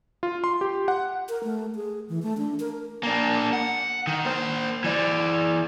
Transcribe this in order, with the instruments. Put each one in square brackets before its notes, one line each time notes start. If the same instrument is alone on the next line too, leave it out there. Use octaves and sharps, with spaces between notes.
[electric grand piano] F4
C6
G4
F#5
[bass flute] A#4
A3
G#4
E3
A3
D4
A#4
[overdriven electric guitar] A#3 D4
F#5
D#3
A#3 C5
E3 D5